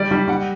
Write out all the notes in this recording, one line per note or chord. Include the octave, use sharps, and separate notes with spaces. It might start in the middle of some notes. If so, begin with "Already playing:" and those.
Already playing: G3 D5
G3
G3 F#5